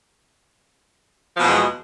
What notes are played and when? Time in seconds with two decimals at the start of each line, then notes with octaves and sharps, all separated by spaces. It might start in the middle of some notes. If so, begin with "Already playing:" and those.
1.35 F3
1.39 B2
1.43 E2
1.48 G#3